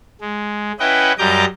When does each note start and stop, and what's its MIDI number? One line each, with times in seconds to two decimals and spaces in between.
0.21 0.72 56
0.79 1.12 61
0.79 1.12 64
0.79 1.12 71
0.79 1.12 75
0.79 1.12 78
0.79 1.12 79
1.19 1.45 42
1.19 1.45 55
1.19 1.45 75
1.19 1.45 82
1.19 1.45 86
1.19 1.45 91